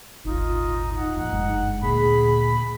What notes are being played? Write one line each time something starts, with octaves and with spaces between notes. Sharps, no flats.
D#1 G#1 D#4 F4
D#4 F#5
F2 A#2 F#5
F#1 G2 G#3
D2 A#2 G#4 B5